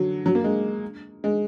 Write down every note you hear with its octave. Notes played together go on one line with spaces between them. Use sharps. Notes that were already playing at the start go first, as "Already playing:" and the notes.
Already playing: D3 F#3
F#3
A#3
G#3
G#3